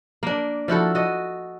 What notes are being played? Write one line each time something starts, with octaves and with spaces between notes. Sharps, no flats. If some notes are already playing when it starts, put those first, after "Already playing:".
A#3 D4
F3 E4 F#4 A4
F#4 D#5